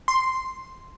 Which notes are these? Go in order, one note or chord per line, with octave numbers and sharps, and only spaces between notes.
C6